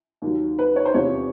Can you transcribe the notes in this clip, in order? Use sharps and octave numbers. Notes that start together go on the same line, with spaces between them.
D#2 D#3 F#3
B4
C#5
C5
E2 C3 F3 C#5